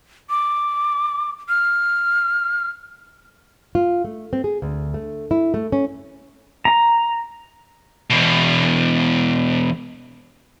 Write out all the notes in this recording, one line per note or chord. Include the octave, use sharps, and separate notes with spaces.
D6
F6
F4
A3
C4
G#4
D2
A3
E4
A3
C#4
A#5
E2 B2